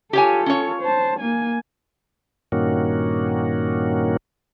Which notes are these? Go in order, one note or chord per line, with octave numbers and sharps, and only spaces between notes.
F4 G4 A4 C#5 G#5
C#4 C#5
C5 A5
A#3 G#5
G2 A#2 D#3 A#3 C#4 F#4